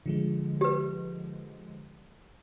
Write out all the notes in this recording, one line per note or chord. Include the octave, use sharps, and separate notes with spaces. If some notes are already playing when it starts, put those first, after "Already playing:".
D3 F3 G#3
G4 B4